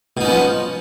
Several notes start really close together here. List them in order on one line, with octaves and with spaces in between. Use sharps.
B2 D#4 C#4 B3 F3